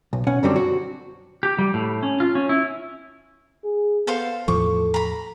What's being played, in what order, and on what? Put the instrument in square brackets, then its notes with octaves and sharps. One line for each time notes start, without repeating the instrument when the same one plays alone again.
[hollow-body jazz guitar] B1
B2 C#4 F#5
F#2 D3 F#3 G3 C4 D4
F#4
[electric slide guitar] G4
G3
A2
C#4
F4
C#4
E4
[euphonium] G#4
[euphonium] B3 [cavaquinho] A4 C5 F5
[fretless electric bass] E2 A2 F3 [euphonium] A4 [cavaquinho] C#6 D6
[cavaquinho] A#5 B5